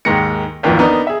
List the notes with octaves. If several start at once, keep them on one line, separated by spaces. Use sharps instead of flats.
D#2 G#2 D#3 G#3 A#6 C#7
G#1 D#2 G#2 E3 F3
B3 D4 D#4 A#4
G#4 E5